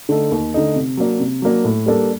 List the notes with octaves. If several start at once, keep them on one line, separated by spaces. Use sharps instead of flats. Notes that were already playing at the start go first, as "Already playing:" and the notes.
D3 A3 D#4 A4
D#2
D3 A3 D#4 A4
C3
F#3 A#3 D4
C3
F#3 A#3 D4
A2
G3 A#3 D4 A4